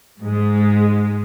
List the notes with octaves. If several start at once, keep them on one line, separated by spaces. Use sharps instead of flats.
G#2 G#3